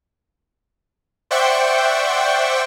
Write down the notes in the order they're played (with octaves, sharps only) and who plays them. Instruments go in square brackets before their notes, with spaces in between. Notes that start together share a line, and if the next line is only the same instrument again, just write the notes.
[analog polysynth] C5 D5 E5 F#5 G5 C#6